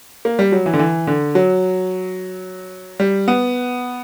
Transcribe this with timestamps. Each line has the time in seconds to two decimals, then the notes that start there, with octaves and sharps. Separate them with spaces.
0.25 A#3
0.39 G3
0.52 F#3
0.66 E3
0.73 D3
0.79 E3
1.07 D3
1.35 F#3
3.00 G3
3.28 B3